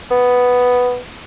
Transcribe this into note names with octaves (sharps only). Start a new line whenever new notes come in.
B3